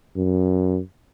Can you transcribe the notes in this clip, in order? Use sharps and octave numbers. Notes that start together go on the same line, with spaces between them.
F#2